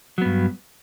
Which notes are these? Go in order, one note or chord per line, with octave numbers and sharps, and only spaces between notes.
G2 F#3 B3